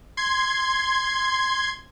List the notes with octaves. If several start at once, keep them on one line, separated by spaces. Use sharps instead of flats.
C6 G#6